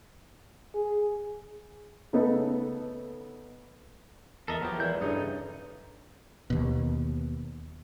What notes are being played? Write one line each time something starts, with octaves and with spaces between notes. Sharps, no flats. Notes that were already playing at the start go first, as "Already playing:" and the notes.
G#4
C#3 A3 B3 D#4 A4 B4
E2 A4 A#4 D#5 E5
F3 F#3 B3 G4
E2 E3 G#3 E4 G6
G2 C#3 D#4 A4 D#6
D#2 B2